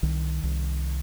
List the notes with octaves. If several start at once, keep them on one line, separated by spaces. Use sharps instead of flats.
C2 D#3
C2